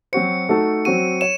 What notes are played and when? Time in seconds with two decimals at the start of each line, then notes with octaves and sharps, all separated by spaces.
0.13 F#3 C4 F#4 C5 C#7
0.49 A3 D#4 F#4 A4
0.85 F#3 C4 F#4 D#7
1.21 C#5 E7